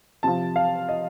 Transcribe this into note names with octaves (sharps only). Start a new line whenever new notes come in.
C3 F3 A5
F5
D#5